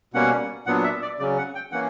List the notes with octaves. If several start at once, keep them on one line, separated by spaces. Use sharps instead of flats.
B2 G3 A#3 C#4 F#5
A#2 F#3 B3 D4 F#5
E5
D5
C#3 F#3 C#4 D5
F#5
G5
E3 A#3 C#4 F#5